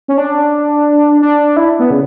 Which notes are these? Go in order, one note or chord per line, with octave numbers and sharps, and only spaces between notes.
C#4
D4
D4
E4
B3
C#3